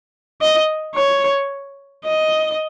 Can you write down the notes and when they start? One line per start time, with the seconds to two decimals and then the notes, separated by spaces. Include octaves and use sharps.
0.41 D#5
0.95 C#5
2.05 D#5